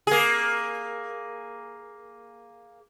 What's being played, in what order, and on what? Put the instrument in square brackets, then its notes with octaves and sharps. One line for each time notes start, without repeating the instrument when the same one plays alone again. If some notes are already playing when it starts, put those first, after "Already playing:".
[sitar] A#3 G#4